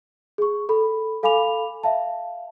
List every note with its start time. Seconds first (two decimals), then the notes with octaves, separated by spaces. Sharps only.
0.38 G#4 C#6
0.69 A4 B5
1.23 A4 F5 G#5 B5 D6 F7
1.83 E5 F5 A5